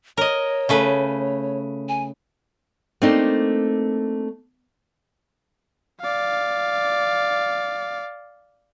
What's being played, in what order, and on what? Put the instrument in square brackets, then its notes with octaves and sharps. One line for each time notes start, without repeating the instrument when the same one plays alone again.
[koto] A#4 D#5 [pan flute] C#5
[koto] C#3 A3 B4
[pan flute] G#5
[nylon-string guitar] A3 A#3 C4 D4 D#4
[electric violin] D5 F5